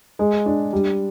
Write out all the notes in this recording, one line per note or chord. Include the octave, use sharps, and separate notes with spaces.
G#3
D4
G3